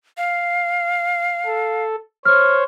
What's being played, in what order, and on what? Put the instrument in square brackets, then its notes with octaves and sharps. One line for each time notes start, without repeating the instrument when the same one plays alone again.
[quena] F5
[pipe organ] A4
[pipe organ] C5 C#5 [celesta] F6